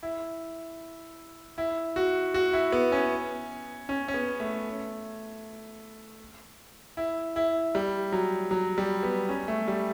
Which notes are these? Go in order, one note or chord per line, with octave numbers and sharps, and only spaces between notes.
E4
E4
F#4
F#4
E4
B3
C#4
C#4
C#4
B3
A3
E4
E4
G3
F#3
F#3
G3
B3
C#4
A3
G3